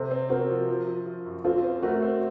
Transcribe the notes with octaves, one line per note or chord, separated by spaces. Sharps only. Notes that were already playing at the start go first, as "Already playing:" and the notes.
Already playing: C3 A4 C5
C4
C4 F#4 A#4
F3
F3
F3
F3
F#2
C4 F4 A4
C4
A3 F#4 A#4
C4